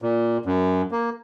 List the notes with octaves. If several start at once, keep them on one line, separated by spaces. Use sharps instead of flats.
A#2
F#2
A#3